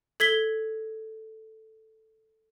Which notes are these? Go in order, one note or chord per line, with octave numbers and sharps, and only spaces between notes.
A4 G#6 B6 G7